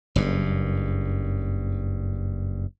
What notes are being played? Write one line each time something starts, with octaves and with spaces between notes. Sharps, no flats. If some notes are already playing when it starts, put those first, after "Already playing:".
F#1 G2